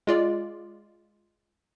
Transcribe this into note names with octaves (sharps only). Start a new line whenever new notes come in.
G#3 F4 D5